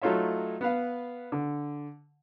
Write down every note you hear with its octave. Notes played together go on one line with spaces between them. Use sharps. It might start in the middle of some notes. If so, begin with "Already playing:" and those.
F#3 A3 D#4 F4 C#5 E5
B3 B4 F5
D3